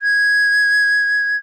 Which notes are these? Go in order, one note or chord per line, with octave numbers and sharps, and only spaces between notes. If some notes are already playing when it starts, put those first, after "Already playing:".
G#6